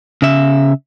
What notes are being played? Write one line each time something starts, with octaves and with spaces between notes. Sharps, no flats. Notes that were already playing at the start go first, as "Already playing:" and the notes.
C#3 E5